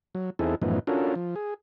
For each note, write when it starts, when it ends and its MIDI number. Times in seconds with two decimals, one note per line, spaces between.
0.15 0.30 54
0.39 0.55 40
0.39 0.55 60
0.39 0.55 63
0.39 0.55 64
0.39 0.55 68
0.39 0.55 69
0.62 0.79 42
0.62 0.79 45
0.62 0.79 52
0.62 0.79 53
0.62 0.79 59
0.62 0.79 63
0.87 1.15 61
0.87 1.15 62
0.87 1.15 65
0.87 1.15 66
0.87 1.15 69
0.87 1.15 70
1.15 1.35 53
1.36 1.54 68